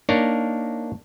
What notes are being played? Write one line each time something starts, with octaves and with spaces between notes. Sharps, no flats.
A#3 D4 D#4 A#4 C#5